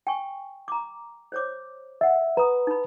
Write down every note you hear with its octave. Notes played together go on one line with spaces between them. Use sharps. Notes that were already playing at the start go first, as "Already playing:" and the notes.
G5 G#5 C#6
A#5 D6
C5 C#5 D6
D#5 E5 F#5
B4 A#5 D#6
D#4 B5